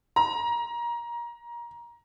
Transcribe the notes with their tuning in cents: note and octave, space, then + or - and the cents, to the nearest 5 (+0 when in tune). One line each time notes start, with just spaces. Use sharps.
A#5 +20